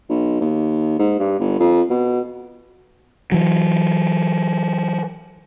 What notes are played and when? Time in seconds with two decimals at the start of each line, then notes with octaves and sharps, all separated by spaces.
0.09 B1
0.41 D#2
0.99 G#2
1.20 G2
1.39 G1
1.60 F2
1.90 B2
3.32 E3 F#3